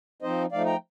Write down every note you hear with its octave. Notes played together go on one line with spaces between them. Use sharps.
F3 C4 D#4 C5 D#5
F3 A3 D#4 D5 F5
G5 A#5